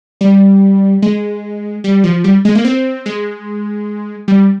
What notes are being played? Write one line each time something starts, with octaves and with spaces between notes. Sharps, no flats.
G3
G#3
G3
F3
G3
G#3
A#3
C4
G#3
G3